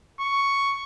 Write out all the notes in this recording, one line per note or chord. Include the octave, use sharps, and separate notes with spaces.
C#6